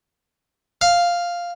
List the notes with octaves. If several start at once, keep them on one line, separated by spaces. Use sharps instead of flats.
F5